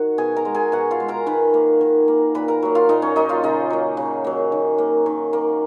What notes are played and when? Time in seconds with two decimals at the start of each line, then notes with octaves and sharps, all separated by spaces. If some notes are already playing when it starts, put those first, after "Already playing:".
Already playing: D#3 F#4 F#5
0.18 B2 G#4 G#5
0.36 A#4 A#5
0.45 G#3
0.55 G#4 G#5
0.72 B2 F#4 F#5
0.91 F4 F5
1.00 G#3
1.08 A#4 A#5
1.26 D#3 B4 B5
1.54 A#3
1.81 D#3
2.08 A#3
2.35 A#2 B4 B5
2.48 A#4 A#5
2.63 F#3 A#3
2.75 F4 F5
2.89 A#2 D#4 D#5
3.02 C#4 C#5
3.16 F#3 A#3 D#4 D#5
3.29 F4 F5
3.43 C#3 D#4 D#5
3.70 F#3 A#3
3.97 C#3
4.24 F#3 A#3
4.52 D#3
4.78 A#3
5.06 D#3
5.33 A#3